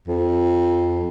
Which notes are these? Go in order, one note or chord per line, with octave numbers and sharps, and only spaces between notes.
F2